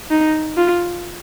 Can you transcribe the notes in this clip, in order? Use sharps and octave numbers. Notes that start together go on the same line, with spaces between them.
D#4
F4